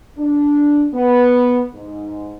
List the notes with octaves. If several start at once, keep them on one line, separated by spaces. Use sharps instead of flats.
D4
B3
G#2